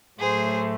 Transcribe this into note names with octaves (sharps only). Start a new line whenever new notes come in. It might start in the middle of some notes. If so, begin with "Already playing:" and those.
A2 F#3 A3 G#4 C5